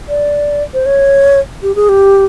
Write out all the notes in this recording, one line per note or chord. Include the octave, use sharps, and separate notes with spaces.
D5
C5
C#5
G4
G#4
G4